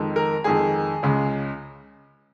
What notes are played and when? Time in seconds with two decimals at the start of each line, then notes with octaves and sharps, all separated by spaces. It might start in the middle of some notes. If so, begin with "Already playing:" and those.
Already playing: F2 D#3 G#3
0.16 A#4
0.44 F2 D#3 G#3 G#4
1.03 C#2 C#3 G#3